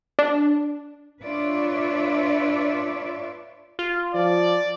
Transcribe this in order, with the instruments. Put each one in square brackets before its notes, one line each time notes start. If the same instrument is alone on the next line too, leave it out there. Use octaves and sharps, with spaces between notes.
[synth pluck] D4
[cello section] D4 F4 B4 C#5 D5 E5
[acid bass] F4
[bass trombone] F3 [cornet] D5